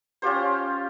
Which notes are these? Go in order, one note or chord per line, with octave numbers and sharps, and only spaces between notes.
C#4 F4 G4 C5